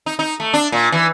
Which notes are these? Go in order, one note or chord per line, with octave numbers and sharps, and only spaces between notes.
D#4
D#4
A3
D4
A#2
E3